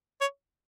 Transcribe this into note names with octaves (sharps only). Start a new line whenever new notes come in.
C#5